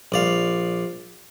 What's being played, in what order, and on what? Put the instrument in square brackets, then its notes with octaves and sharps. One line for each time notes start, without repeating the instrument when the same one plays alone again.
[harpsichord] A#1 D5 F5